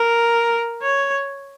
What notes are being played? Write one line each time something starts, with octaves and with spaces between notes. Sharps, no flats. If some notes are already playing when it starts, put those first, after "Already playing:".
Already playing: A#4
C#5